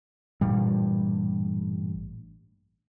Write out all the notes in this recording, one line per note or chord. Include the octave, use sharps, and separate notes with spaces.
A1 G2 A#2 G3